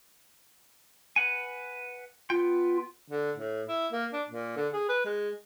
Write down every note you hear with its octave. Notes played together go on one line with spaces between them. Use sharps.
B4 F#5 G#5
B3 F4 G5
D3
A2
E4
A#3
D4
A#2
D3
G#4
B4
G#3